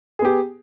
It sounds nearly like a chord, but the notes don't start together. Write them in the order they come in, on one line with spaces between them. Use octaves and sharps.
G#4 B3 G4